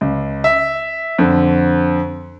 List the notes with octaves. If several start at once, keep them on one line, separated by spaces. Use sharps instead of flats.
C#2
E5
F2 D3